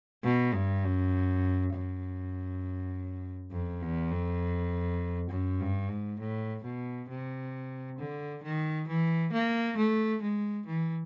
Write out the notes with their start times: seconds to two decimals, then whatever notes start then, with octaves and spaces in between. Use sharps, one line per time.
0.24 B2
0.53 G2
0.84 F#2
1.73 F#2
3.51 F2
3.82 E2
4.11 F2
5.30 F#2
5.60 G2
5.90 G#2
6.19 A2
6.64 B2
7.09 C3
7.98 D3
8.43 D#3
8.88 E3
9.33 A#3
9.77 A3
10.22 G#3
10.66 E3